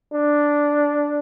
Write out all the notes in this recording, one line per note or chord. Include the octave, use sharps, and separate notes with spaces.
D4